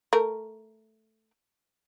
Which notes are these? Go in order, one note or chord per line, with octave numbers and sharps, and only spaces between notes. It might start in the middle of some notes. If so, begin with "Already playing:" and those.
A3 A#4